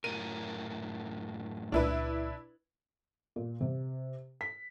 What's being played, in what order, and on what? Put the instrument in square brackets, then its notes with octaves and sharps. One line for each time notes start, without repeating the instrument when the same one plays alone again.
[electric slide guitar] F#2 A2 A#4 [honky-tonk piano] D#7
[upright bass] C#2 A#2 [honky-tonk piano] D4 E4 B4
[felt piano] A#2
C3
B6